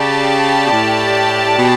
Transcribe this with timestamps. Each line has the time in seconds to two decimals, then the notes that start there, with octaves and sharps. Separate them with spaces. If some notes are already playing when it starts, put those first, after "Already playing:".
Already playing: C#3 G4 D5 A5
0.65 B2
0.71 A2
1.58 B2